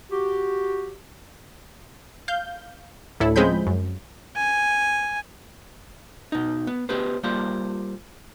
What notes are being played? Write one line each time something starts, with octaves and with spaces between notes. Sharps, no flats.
F#4 G4
F5 G6
D2 A2 E4 A4
F3 G#3 C4 C#4 B5 G6
F#2
G#5
B2 D#4
B3
B3 G4 B4 C5
G3 A#3 F4 C5